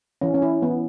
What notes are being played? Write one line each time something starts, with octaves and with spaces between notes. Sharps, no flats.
E3 C#4
C#4
E4
E3 B3